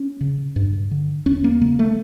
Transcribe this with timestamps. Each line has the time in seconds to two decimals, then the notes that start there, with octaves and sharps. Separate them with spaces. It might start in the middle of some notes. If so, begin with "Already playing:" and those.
Already playing: C#4
0.21 C#3
0.56 G2
0.91 D3
1.26 E2 C#4
1.44 A#3
1.61 C#3 A#3
1.79 A3